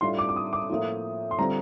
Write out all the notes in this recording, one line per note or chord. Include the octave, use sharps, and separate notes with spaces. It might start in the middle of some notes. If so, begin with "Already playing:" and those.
A2 G3 D4 F4 C6
D6
D6
D#6
D6
A2 F3 A#3 F4
C6
D3 G3 C4 F4 A#5